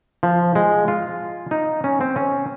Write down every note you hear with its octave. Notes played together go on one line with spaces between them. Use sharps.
F3
G#3
F4
D#4
C#4
C4
C#4